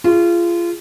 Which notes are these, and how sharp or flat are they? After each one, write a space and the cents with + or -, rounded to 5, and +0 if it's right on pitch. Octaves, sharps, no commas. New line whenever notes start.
F4 -25 G#4 +0